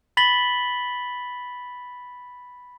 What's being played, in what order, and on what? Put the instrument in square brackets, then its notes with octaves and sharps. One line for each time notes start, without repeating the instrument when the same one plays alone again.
[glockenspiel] B5 A6 B6 F#7 G7